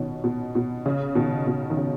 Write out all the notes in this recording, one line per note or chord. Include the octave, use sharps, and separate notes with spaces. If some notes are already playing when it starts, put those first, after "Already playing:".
Already playing: B2 D#3 C#4
B2
B2
C#3
B2 D#3
B2
D#3
C#3